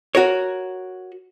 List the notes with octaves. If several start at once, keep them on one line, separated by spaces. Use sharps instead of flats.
F#4 A#4 C#5